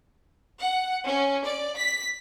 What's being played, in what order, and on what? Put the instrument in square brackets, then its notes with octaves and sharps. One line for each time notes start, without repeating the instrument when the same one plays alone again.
[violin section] F#5
C#4
D5
B6